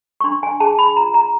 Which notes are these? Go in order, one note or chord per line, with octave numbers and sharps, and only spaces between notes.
C#6
D4 C6
G#5
G#4 A5
B5
F4 A#5
A#5